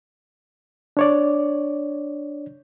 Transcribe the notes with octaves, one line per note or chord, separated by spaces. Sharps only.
D4 C#5 D5